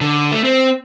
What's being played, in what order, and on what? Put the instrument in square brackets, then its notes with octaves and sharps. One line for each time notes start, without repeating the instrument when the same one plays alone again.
[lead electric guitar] D3
A3
C4